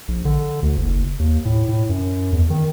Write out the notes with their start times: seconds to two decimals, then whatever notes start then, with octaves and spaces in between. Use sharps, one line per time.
0.08 A#1
0.25 D3
0.63 D2
0.77 F#1
1.19 D#2
1.45 A2
1.68 A2
1.89 F#2
2.33 E2
2.50 D#3